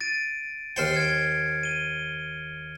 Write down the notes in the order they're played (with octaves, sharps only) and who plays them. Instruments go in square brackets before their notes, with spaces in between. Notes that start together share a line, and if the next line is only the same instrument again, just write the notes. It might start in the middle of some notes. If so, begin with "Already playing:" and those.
[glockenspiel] A6 D7 D#7
[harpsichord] D#2 C5 G5 [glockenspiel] F6 A6 C#7
[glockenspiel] G#6 D7
D#7 G7